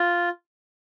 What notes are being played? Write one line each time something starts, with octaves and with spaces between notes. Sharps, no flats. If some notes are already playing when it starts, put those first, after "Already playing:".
Already playing: F4